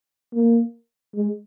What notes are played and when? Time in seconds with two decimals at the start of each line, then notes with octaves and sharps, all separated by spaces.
0.33 A#3
1.15 G#3